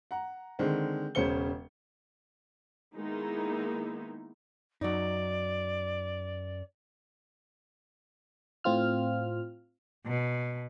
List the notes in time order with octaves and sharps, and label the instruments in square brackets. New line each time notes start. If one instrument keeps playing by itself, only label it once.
[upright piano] F#5 A#5
D3 D#3 G#3 C4
E1 C#3 C#4 C5 C#7 G7
[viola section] D#3 G#3 A#3 B3 D#4 E4
[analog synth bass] F#2 [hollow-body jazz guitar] F#3 D#4 [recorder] D5
[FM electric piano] A2 C4 F4 F6
[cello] B2